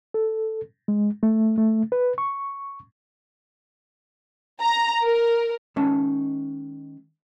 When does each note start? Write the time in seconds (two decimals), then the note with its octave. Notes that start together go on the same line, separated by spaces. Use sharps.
0.14 A4
0.88 G#3
1.23 A3
1.58 A3
1.92 B4
2.18 C#6
4.61 A#5
5.04 A#4
5.76 D#3 G#3 C#4 E5 A5